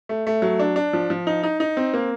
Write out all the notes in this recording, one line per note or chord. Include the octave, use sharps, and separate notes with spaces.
A3
A3
F#3
D4
D4
F3
F3
D#4
D#4
D#4
C4
A#3